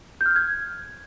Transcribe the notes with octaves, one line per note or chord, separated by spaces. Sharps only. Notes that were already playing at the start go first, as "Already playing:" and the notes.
G6
F6
G6
G#6